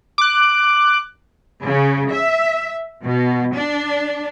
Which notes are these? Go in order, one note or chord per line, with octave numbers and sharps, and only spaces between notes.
D6 F#6
C#3
E5
B2
D4